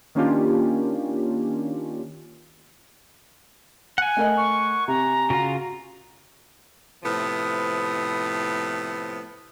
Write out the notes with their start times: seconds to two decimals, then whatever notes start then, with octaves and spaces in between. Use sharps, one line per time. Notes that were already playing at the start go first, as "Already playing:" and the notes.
0.15 D#3 A#3 C#4 D4 F4 G4
3.98 F#5 G#5
4.17 A3 A#4 D#5
4.37 C#6
4.88 C3 A#5
5.30 C#3 F4 F#4
7.03 A2 C3 F3 B3